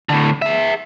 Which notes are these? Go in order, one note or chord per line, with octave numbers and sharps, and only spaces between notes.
A2 D3
G#4 E5